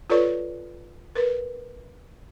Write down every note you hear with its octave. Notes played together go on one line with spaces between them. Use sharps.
F4 A4 B4 C#5 D5 C#6
A#4 B4